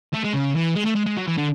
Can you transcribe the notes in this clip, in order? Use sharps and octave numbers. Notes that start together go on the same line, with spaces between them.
A3
G#3
C#3
E3
G#3
A3
G#3
G#3
F#3
E3
D3